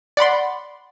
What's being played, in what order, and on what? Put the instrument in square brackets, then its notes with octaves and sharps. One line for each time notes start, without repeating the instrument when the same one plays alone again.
[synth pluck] D5 F#5 B5 C6